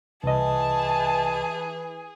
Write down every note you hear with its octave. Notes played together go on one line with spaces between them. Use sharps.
C2 E3 G#4 D#5 A5